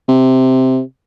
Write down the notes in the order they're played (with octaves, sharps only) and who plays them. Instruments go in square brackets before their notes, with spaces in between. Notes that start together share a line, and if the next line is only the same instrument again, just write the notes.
[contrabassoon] C3